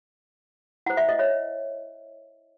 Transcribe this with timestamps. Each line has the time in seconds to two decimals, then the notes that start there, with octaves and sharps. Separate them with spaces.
0.86 E4 C5 F#5
0.97 E5
1.09 D#5
1.19 C#5 E5